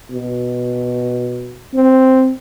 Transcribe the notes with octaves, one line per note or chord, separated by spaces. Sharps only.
B2
C4